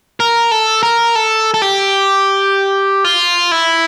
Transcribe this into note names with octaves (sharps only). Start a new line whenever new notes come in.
A#4
A4
A#4
A4
A4
G4
F4
E4